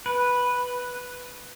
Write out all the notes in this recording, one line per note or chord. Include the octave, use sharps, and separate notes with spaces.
B4